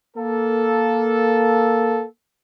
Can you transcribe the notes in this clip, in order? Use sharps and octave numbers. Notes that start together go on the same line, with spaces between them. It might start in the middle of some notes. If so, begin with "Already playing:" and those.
A#3 A4